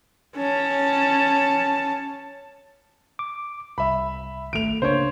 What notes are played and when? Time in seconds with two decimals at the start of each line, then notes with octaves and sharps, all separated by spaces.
0.37 C#4 A5
3.19 D6
3.78 C2 E5 B5
4.53 G#1 A3 D7 F7
4.82 C#3 A#3 D4 C5 C#5